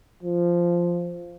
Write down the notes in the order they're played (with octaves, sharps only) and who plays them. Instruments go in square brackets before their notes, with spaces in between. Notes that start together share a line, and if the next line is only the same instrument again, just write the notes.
[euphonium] F3